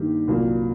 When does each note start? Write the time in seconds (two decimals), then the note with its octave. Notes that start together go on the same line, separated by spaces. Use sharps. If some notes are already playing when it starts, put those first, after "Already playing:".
Already playing: G2 D#3 G3 A#3
0.28 C2 A#2 F#3 A#3